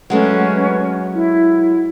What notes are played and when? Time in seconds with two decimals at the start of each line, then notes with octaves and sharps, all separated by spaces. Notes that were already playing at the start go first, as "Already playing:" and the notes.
0.10 F#3 G#3 A3 C#4 B4
1.14 E4